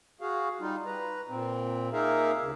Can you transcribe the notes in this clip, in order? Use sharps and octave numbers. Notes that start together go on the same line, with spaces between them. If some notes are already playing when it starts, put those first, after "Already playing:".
F#4 G#4 F5
G3 D#4 F4
B4 A#5
A#2 C4
A#3 D#4 G#4 A#4 E5 F5
D2 C#3